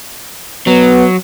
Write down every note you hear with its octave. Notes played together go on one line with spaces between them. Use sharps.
F#3 B3